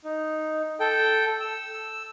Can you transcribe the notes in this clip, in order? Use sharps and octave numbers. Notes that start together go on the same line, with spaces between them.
D#4
A4 G5
E6